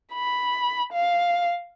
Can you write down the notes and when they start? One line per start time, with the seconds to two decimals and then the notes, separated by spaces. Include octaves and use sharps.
0.14 B5
0.93 F5